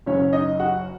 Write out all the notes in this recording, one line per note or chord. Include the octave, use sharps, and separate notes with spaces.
F#1 F#2 C#3 C#4 C#5
D#4 D#5
F#4 F#5